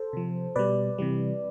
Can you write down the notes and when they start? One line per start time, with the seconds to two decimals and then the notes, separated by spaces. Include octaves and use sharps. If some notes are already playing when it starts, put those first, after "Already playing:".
Already playing: A4 C5
0.13 C3 F3
0.56 B2 G3 B4 D5
0.98 C3 E3 G3